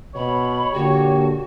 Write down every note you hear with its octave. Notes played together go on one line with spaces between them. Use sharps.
B2 C#5 B5
A#2 D3 F#4 G4